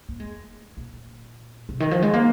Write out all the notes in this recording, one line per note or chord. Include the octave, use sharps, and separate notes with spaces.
A#3
G#3
A#2
C3
D#3
F3
G#3
A#3